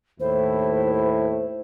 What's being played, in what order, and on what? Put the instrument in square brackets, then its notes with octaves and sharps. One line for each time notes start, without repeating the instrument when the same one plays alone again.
[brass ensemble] D#2 A2 E4 [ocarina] C5